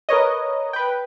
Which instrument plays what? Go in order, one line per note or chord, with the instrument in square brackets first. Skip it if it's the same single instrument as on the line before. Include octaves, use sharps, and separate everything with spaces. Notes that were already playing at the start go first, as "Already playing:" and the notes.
[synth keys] A#4 B4 C#5 D#5
B4 G5